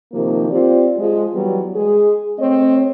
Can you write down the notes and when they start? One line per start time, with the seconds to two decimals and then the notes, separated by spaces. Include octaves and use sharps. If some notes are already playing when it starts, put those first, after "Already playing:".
0.13 C3 D#3 F3 A#3
0.50 C4 F4 G4 D5
0.99 F3 G#3
1.34 E3 F#3 G3 B3
1.76 G#3 G#4
2.40 A3 C4 C#5 D#5